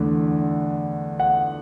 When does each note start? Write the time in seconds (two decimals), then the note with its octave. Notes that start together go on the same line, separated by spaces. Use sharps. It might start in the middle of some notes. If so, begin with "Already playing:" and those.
Already playing: E2 D3 A3 D4
1.20 F#5